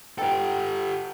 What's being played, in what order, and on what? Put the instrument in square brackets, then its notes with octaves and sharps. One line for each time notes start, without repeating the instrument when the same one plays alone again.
[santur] B3 D#4 G5 [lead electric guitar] G4 A4